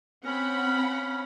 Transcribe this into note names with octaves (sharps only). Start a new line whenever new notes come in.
C4 C#4 F#5 B5